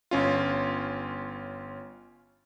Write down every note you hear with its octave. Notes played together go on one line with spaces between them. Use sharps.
G1 C#4 F4